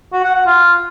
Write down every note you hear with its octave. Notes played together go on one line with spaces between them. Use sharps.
F#4
F#5
F#5
F4